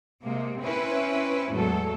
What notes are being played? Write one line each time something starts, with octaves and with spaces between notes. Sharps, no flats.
C3 G#3 A#3
C4 C#4 E4 B4
E2 A2 F#3 G#3 A4